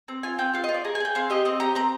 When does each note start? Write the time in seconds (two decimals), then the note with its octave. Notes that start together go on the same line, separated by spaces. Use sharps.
0.08 C4
0.23 F4 G#5
0.38 C4 G5
0.54 F4 F5
0.64 D#5
0.69 F4
0.74 D5
0.85 G#4 A#5
0.95 G#5
1.00 G#4 G5
1.15 C4 F5
1.30 G4 D#5
1.45 C4 D#5
1.60 G4 A#5
1.75 C4 A#5